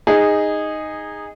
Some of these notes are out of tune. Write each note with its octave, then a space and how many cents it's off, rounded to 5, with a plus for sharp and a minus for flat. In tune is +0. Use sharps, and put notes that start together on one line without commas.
D#4 +0 G#4 -15